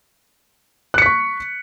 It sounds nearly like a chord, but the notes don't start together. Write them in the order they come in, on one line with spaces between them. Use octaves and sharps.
F#6 C#7 B6 C#6